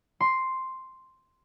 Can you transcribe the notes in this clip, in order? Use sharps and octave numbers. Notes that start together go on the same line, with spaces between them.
C6